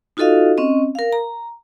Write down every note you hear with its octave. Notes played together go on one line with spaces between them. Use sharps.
D#4 F4 F#4 A4 D#5 F5
C4 C#4 D#5
A#4 F5
A#5